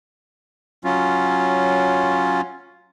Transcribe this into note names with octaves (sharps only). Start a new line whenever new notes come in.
F#3 C#4 F4